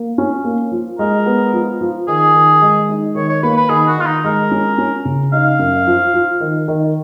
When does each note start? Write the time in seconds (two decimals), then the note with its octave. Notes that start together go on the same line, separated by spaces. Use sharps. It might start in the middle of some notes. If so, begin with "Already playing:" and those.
Already playing: A#3
0.18 C#4
0.45 A#3
0.71 F3
0.99 G#3 A#4
1.26 B3
1.53 F3
1.81 F3
2.08 D#3 G#4
2.34 D#3
2.62 G#3
2.89 D#4
3.15 D#3 C#5
3.29 C#5
3.43 A#3 B4
3.57 B4
3.69 D#3 G#4
3.87 F#4
3.97 D#3 F4
4.06 D#4
4.24 G#3 A#4
4.51 C#4
4.78 C#4
5.05 C#3
5.33 D#4 F5
5.59 F#2
5.87 F3
6.14 F3
6.40 D#3
6.68 D#3